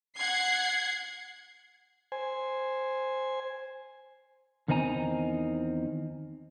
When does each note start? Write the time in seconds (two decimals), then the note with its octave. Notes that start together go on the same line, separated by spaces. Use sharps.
0.15 F#5 G#6 C7
2.12 C5 G#5
4.68 E2 D#3 C4 D#4 G#5 A#5